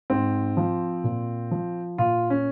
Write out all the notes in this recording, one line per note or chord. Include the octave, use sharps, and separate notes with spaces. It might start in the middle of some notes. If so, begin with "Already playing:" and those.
G#2 C4
F3
A#2
F3
A#2 F4
C#4